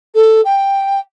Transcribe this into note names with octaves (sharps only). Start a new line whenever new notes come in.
A4
G5